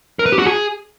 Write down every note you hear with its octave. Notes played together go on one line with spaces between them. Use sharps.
A#4
B4
G4
F#4
G#4